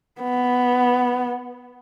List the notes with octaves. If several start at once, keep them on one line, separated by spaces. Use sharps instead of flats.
B3